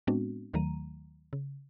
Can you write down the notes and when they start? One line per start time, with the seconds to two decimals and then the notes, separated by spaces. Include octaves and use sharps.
0.07 A2 G#3 B3 C4 D4 F#4
0.54 D#2 D#3 F#3 A3 A#5 D#7
1.33 C#3